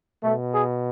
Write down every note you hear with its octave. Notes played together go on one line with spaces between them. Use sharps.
B2 A3
G#4